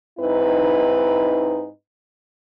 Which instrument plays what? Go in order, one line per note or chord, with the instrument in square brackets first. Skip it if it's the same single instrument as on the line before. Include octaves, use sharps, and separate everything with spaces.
[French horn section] G#2 C4 D#4 E4 B4